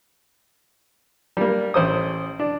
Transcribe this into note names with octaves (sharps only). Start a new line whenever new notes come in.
G3 A#3
A1 C5 D#6
D4